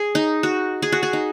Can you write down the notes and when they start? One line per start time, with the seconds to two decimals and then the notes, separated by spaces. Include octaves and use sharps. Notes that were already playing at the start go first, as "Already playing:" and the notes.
Already playing: G#4
0.15 D#4
0.43 F#4
0.82 G#4
0.92 F#4
1.03 G#4
1.13 D#4